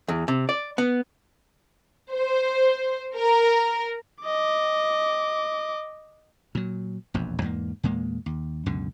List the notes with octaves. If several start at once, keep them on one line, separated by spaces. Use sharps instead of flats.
E2
C3
D5
B3
C5
A#4
D#5 D6
A#2 F#3
E1 A#1 F2
E2 G#2 G#3 A#3
E2 A#2 G#3 A#3
D#2
C#2 F#2 B2 D3